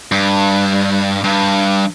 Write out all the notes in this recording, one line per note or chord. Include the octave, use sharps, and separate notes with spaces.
G2
G2